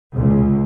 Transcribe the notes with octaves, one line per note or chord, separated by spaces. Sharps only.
C#2